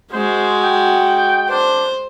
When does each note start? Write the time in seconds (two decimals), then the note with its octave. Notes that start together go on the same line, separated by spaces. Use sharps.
0.13 G#3 F#4 C5
0.63 G5
1.49 D4 C5